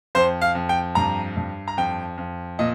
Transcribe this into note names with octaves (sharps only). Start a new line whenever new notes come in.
F2 C5
F5
F2
G5
G2 A#5
G2
A#5
F2 G5
F2
A#2 D#5